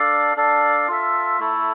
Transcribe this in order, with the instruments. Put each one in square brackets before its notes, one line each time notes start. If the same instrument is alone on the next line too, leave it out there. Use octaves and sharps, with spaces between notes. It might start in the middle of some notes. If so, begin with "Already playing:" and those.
Already playing: [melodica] D4 A4 D5 F5
D4 A4 D5 F5
F4 A4 E5
A3 E4 A4